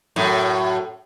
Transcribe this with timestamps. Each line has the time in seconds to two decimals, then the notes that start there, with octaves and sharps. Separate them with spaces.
0.16 F#2 A2